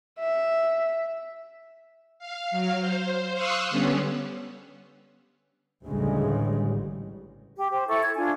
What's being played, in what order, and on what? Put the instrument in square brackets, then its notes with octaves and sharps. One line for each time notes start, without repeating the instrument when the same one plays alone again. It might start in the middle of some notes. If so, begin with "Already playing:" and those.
[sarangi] E5
[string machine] F5
F#3 F5
C5
F5 C6 C#6 D#6 E6 F#6
D3 G3 B3 C#4
[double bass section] A1 D2 A2 C#3 G3 G#3
[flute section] G4
G4 C5
E4 A4 C#6
G#6
D4 F4 G#5